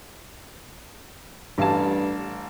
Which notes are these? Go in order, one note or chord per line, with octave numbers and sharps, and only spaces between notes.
A1 G2 F5 A5